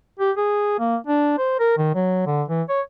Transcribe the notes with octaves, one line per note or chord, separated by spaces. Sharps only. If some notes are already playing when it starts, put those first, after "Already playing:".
G4
G#4
A#3
D4
C5
A#4
D#3
F#3
D3
E3
C#5